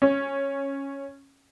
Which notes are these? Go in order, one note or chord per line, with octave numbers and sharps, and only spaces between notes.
C#4